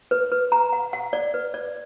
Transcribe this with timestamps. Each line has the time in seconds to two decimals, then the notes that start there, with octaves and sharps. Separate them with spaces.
0.11 B4
0.32 B4
0.52 A#5
0.73 F#5
0.93 F#5
1.13 D5
1.34 B4
1.54 D5